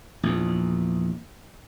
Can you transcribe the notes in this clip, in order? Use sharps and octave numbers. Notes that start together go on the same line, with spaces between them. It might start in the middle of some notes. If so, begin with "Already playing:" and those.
A#1 E2